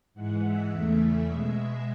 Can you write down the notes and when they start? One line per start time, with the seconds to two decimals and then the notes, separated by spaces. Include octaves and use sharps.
0.14 G#2 E3 G#3 F#5
0.42 E5
0.71 E2 C#3 E3 A3
1.26 B2 G#3